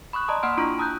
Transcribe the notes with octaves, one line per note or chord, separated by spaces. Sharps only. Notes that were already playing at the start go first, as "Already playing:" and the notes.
B5 C#6 D#6 F#6
D5 D#5 A5 A#5 C6 D#6
A#3 F#5 B5 C6 F6 D7
D4 E4 F4 A#5 C#6 D7
A5 A#5 D#6 E6 F#6 G6